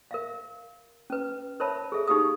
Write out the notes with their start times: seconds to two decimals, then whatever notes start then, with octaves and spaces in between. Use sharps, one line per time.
0.11 A#4 E5 F5
1.10 C#4 B4
1.60 A#4 C5 C#5 E5 A5 B5
1.92 G#4 A4 E5
2.08 D#4 G4 G#4 F5 D#6